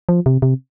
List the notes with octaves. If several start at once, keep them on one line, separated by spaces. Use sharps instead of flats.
F3
C3
C3